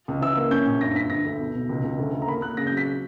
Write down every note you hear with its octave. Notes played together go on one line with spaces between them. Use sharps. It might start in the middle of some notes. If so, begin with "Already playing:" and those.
C#2
E3 E6
A#3
C#4 G6
A#1
G2 A#6
G2 B6
D3 A#6
D2
B2
B1
C#2
C#2
D2
D2
A#5
A#3 B5
A#3 F#6
C#3 A#6
G6
F#3
B6